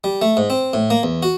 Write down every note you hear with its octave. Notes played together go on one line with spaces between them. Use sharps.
G3
A3
G#2
C4
A2
A#3
E2
F#4